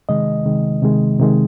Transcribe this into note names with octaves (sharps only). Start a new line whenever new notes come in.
C3 D#3 G#3 D#5
C3 D#3 G#3
C3 D#3 G#3
C3 D#3 G#3